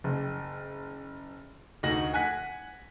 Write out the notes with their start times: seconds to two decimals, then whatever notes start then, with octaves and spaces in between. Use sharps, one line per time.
0.04 F#1
1.83 D2 D#4 F#4 A#6 F#7
2.14 F#5 G#5 F#6 B6